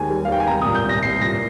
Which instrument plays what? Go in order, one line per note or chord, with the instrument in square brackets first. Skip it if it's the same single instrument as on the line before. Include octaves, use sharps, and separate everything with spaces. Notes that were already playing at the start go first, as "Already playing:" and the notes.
Already playing: [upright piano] D#2 G#3 G#5
G3
F5
D#2 G5
G#5
C2 A#5
A#2 D#6
G6
C2 A#6
C2 C7
A#2 A#6